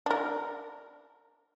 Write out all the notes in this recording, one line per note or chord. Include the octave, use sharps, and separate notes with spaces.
D4 A#4